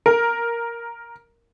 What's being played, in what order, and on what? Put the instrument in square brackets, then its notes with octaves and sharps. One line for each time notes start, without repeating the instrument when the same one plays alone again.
[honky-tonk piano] A#4